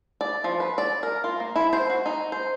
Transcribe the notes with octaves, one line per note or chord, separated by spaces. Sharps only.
D5
F3
B4
D5
A#4
F4
A#3
E4
C5
F#4
D#4
C5